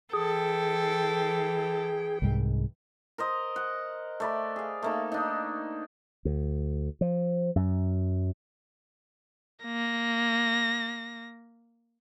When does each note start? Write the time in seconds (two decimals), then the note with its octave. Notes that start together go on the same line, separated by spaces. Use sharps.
0.13 E3 G#4 A4 G5
2.22 C2 G#2 G#3
3.18 A#4 C5 D#5
3.56 F#5
4.20 A3 D5 B5
4.56 G#4 F5
4.82 A3 A#3 D#4
5.12 D4 D#4
6.25 D2
7.01 F3
7.56 F#2
9.64 A#3 A#6